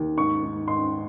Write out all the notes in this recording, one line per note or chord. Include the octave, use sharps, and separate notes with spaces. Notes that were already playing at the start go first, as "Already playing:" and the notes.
Already playing: D#2
G#2 C#6
G#2
G#2 C6